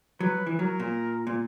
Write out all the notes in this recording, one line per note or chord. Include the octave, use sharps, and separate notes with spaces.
F#3 B4
E3
F#3 A#4
A#2
A#2